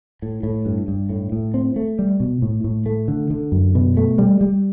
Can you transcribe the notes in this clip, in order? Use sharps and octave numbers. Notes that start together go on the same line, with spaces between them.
A2
A2
G2
G2
A2
A2
C4
A3
G3
B2
A2
A2
A3
D3
D3
F#2
B2
A3
G3
G3